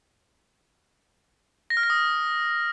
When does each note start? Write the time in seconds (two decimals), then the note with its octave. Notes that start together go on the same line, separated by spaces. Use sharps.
1.70 A#6
1.77 F6
1.83 A#6
1.90 D#6